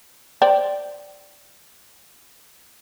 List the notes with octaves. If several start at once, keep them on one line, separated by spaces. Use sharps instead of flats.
C5 D5 G5